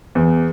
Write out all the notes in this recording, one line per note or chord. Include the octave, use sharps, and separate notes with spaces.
E2